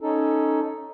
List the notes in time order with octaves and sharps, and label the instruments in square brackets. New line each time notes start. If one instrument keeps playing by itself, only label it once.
[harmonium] C#4 D#4 A4